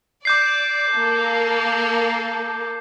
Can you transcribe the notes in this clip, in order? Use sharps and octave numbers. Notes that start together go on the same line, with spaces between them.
D5 D6 G6 C7
A#3 A4